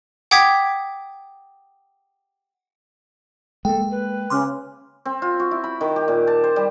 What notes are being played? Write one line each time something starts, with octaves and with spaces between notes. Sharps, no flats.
F#5 G5 D6 D#6 G#6 B6
G#3 A#3 A4 G5
B4
C#3 C6 D6 F6
C4
F4
F#4
E4
B5
D#3
G4
A#2
A5
C5
G3